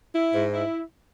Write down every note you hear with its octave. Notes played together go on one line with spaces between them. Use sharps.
E4
G#2
E4